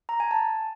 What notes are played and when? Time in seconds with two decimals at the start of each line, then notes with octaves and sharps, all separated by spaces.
0.09 A#5
0.20 G#5
0.31 A5